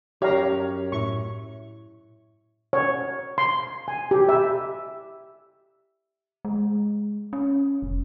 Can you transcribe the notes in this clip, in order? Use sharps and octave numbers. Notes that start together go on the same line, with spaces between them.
F#2 G4 C#5 F5 A#5
A2 E4 E5 C#6
C#5
C6
G#5
G4
E5
G#3
C#4
F1